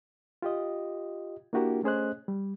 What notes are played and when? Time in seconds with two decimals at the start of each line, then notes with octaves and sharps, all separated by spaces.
0.42 F4 G4 D#5
1.53 A#3 D4 E4 F#4 G4 A#4
1.83 A3 C#4 G#4 C5 D#5 F#6
2.28 G3